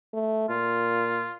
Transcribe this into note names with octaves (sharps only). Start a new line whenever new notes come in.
A3
A#2 F4